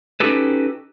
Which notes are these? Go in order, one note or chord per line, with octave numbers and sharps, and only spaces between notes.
C#4 D#4 F#4 G4 A4 B4